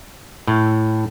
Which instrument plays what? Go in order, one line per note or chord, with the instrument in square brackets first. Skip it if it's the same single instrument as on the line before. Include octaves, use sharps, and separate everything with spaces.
[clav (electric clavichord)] A2